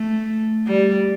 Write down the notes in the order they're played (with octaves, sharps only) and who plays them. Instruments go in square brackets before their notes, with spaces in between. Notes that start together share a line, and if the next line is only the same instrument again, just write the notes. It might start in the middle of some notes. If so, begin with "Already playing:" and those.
Already playing: [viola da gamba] A3
G3